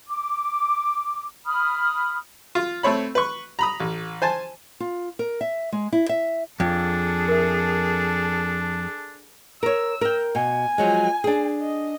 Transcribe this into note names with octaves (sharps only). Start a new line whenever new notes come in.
D6
B5 D#6 F6
F4
A3 C4 C#5 B5
B4 C#6
A#5 B5 D#6
A1
C5 G#5 A5
F4
A#4
E5
G#3
E4
E5
F2 D4 G#4 A4
A#4 E5
A#4 C#5 E6
A#4 G5
B2 G#5
F3 F#3 G#3
D4 G#4
D#5